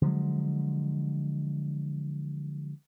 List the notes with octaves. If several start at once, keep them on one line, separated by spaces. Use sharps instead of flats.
D3 F3 F#3 G#3